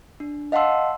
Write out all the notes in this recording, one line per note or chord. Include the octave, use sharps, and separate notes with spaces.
D4
D#5 F5 F#5 A5 C6 E6